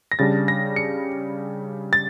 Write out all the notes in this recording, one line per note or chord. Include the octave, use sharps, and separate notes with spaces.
A#6
C#3 G3 D4 A6
A#6
C#7
A6